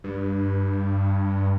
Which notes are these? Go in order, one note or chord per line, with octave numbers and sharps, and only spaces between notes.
G2